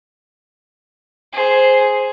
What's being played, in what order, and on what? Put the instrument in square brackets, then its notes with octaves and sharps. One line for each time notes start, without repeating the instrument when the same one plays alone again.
[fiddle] G#4 C5